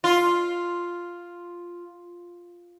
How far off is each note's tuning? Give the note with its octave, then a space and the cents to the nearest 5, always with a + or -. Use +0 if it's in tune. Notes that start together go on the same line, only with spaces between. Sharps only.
F4 +0